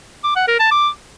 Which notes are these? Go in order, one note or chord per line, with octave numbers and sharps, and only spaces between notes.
D6
F#5
A#4
A5
D6